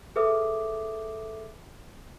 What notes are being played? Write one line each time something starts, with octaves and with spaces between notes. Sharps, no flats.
G#4 A4 B4 E5 D6 D#6